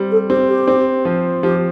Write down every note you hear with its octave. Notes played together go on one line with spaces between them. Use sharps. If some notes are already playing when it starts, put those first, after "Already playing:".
Already playing: G3 C4
A4
C4 G4
G4
C4
F3
F3 G4